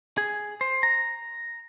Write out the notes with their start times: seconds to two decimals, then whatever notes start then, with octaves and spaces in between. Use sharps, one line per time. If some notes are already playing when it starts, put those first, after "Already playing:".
0.18 G#4
0.61 C5
0.83 A#5